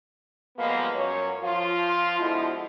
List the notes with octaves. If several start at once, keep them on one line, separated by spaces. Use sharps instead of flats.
F3 G3 G#3 A#3 B3
F#2 C#5
F3 F4
B2 D3 F3 G#3 E4